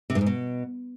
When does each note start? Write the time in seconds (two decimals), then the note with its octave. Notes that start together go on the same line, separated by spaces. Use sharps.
0.10 C3
0.15 G2
0.21 G#2
0.26 B2